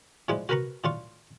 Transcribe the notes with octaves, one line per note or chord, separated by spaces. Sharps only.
A2 F3 G#3 D4 E4
F#4 A#4 B4 A#5 B5 C#6
A2 D4 F4 C#6